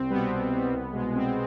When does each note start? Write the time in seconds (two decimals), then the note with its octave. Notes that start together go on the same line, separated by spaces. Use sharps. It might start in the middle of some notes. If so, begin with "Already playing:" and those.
Already playing: C2 C4
0.10 B2 G3 B3
0.31 C2 B3
0.52 B2 G3
0.73 C2
0.93 B2 G#3
1.14 C2 C4